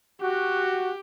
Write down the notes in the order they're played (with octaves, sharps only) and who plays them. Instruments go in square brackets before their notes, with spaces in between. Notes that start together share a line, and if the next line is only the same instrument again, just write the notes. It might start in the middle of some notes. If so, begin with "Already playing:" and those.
[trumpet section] F#4 [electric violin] G4